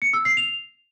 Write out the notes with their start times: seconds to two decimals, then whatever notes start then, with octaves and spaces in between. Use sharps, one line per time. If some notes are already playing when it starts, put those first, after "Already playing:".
0.02 C#7
0.13 E6
0.25 C7
0.37 F7